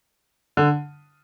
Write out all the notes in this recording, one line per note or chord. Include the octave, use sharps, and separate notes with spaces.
D3